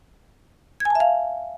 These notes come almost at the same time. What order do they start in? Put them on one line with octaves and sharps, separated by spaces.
G#6 G#5 A5 E5 F5